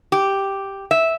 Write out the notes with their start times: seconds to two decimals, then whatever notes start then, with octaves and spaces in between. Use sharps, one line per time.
0.12 G4
0.91 E5